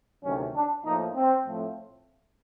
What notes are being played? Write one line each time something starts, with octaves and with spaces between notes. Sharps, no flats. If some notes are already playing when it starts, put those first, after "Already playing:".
D2 C3 D#3 F#3 C#4
D4
A2 F3 A#3 D#4
C4
A2 F3 A3 C4